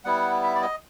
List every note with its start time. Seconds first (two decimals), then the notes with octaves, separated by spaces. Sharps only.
0.04 G3 B3 E4 F#5
0.43 E5
0.55 D5
0.62 D#5